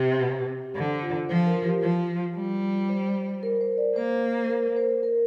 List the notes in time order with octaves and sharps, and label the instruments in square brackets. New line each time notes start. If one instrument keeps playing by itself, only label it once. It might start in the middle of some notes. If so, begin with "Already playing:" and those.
Already playing: [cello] C3 [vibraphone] G4
[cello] D3 [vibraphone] C5
[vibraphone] F4
[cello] F3 [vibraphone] C5
[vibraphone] A#4
G4
[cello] F3 [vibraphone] F4
[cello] G3
[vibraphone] C5
A#4
C5
D5
[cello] A#3 [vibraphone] C5
[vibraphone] A#4
C5
A#4